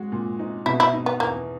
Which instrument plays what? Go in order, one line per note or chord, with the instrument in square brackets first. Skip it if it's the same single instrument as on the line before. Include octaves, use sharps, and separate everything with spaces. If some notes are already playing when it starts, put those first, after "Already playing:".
Already playing: [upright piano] G#3 F#4
A#2
D#4
[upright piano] B2 [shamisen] E4
[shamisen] E4
[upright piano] D#4
[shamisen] B3
[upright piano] E2 [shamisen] A#3